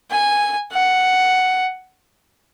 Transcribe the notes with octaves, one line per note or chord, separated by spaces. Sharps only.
G#5
F#5